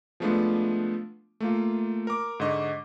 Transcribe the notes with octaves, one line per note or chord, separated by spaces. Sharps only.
F3 G#3 A3 B3 D4 F4
A3 A#3 F4
A#4 D6
G#2 D3 D#5 C#6